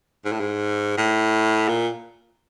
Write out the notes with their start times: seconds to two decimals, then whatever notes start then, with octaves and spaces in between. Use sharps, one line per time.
0.25 G#2
0.32 A2
0.40 G#2
0.98 A2
1.69 A#2